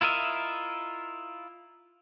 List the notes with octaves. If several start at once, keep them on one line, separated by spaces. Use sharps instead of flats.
E4 F4 A#4 D#5 E5